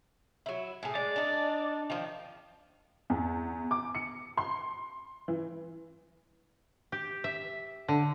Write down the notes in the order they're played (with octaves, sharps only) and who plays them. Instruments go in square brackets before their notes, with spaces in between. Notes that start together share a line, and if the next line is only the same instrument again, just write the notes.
[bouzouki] F#3 E4
A2 G#4
[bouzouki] G#3 [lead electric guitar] D5
[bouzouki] D4 D#4
D#3 F3
[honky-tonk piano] E2
D6
C#7
C6
E3
[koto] G4
E5
D3